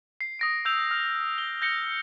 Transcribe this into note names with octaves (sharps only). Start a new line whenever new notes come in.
C7
D#6 A#6 D7
E6 G6 F7
F6
G7
G6 A#6 C#7 G7